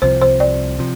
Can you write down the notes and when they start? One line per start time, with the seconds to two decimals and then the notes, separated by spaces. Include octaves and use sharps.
0.02 C2 C3 F3 C5
0.22 C5
0.40 D5
0.79 C3 F3